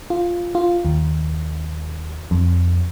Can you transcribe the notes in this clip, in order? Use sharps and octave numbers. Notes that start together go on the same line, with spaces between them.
F4
F4
D#2
F2